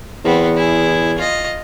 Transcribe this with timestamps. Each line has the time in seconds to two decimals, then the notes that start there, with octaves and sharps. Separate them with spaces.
0.25 E2 B3 C4
0.56 E4 G#4
1.18 F4 D#5